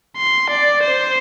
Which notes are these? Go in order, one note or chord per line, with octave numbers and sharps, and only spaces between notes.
C6
D5
C5